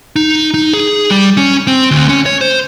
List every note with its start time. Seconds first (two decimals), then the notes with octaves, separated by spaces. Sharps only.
0.16 D#4
0.54 D#4
0.73 G#4
1.11 G3
1.37 C#4
1.67 C4
1.91 D2
2.09 C#4
2.26 C#5
2.41 C5